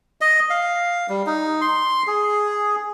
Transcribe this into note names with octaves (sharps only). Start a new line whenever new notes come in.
D#5
F5
G3
D#4
C6
G#4